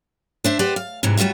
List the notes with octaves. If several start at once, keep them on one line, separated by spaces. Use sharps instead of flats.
D4 C5 E5
G4 B4 C5 D5 F#5
F5
G#2 C3 E3 F#3
F#3 G3 F4 F#4 E5